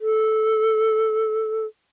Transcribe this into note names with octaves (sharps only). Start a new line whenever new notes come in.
A4